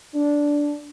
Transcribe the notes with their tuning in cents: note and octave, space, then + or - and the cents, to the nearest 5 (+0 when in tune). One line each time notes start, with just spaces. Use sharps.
D4 -5